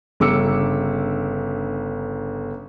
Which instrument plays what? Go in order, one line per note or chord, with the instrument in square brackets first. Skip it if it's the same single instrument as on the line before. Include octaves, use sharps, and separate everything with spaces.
[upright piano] G1 C#3 D6 E6 C#7